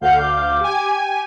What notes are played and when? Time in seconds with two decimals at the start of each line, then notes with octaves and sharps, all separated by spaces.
0.01 D2 A4 F5 F#5 G6
0.18 D6
0.60 G4 G#5